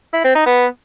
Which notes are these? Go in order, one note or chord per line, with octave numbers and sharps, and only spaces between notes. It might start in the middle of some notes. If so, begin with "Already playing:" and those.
E4
C4
D#4
B3